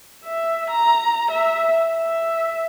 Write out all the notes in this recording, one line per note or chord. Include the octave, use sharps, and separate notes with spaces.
E5
A#5
E5
E5